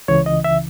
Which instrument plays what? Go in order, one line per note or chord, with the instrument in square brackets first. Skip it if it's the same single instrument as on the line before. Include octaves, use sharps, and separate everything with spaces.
[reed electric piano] C#2 C#3 E3 C#5
D#5
E5